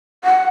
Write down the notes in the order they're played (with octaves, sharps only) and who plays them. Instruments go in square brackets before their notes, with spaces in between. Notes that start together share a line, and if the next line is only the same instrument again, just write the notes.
[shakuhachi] F#5